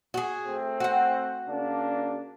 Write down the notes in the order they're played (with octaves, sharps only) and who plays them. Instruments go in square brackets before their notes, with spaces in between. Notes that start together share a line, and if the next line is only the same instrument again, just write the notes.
[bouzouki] F#4 G#4
[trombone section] A3 C4
[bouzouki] F#4 F#5
[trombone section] C#3 A#3 D4